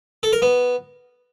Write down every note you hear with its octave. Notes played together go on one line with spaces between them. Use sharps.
A4
A#4
B3